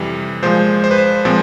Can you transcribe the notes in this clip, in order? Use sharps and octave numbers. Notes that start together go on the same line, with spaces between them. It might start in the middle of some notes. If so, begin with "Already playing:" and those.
Already playing: F2 C3 E3 G3
A#2 F3 G#3 C5
C5
B4
C5
A#2 F3 G#3 C4